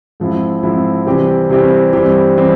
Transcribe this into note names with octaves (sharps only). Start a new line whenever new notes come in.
G#2 F3 C4 E4
G#2 F3 C4 E4
C3 E3 G3 C4 G4
C3 E3 G3 C4 G4
G2 E3 G3 C4 G4
E3 G3 C4 G4